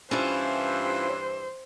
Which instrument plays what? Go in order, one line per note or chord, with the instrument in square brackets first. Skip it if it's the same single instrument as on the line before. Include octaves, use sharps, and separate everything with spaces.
[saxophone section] G2 E3 [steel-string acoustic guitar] C#4 E4 F4 [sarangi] C5